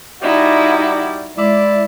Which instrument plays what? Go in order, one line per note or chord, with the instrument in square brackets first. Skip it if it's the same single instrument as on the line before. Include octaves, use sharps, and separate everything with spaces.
[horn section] G3 D5 [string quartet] D#4 E4 F#4
[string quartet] G#3 [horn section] E4 D5